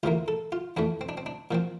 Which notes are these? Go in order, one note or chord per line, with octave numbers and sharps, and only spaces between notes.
D2 C3 E3 A#3 F4
A4
F4
F2 E3 A3 D4
C4
D4
C4
D4
A#2 F3 C4